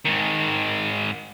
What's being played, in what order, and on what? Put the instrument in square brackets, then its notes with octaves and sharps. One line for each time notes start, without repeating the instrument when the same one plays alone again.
[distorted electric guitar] G#2 D#3